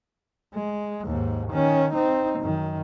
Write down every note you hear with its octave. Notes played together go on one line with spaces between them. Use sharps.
G#3
D#2 G#2
D#3 C#4
C4 D#4
F#2 D#3